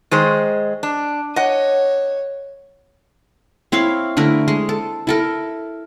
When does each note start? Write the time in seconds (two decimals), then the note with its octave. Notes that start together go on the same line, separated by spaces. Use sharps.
0.11 D#3 G#3 C5
0.83 D4
1.36 C#5 D#5 F#5
3.72 C4 E4 C#5 F5
4.17 D3 A3 E4 A#4
4.48 G#3
4.69 A4
5.07 E4 A4 A#4